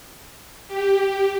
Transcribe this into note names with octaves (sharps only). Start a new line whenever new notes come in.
G4